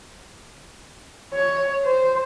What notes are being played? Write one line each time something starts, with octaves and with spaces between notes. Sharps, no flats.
C#5
C5